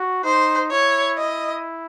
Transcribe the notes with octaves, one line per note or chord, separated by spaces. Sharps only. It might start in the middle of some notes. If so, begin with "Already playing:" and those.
Already playing: F#4
D#4 C5
E4 C#5
D#5